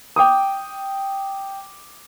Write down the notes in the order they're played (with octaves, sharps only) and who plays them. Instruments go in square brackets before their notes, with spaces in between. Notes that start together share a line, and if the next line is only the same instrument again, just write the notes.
[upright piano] G5 D6 D#6